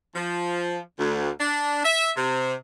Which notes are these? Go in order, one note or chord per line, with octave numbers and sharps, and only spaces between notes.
F3
D2
D4
E5
C3